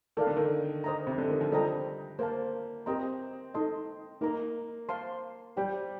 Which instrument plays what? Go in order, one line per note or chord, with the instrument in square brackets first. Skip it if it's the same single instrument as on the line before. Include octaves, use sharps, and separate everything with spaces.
[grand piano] D#3 [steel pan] A4 D5 F5
[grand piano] D3
D#3
[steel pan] C5 D#5 A#5
[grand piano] C3
D3
D#3
F3
[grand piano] G3 [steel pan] A4 C5 D#5 G5 A#5
[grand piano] A#3 [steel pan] C5 F5 A5
[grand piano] C4 [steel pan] G4 A#4 D#5 A#5
[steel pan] D#4 A4 D#5 A5 C6
[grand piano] A#3 [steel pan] D#4 A#4 D#5 A#5
[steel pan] C5 F5 A5 C6
[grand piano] G3 [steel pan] G4 C5 G5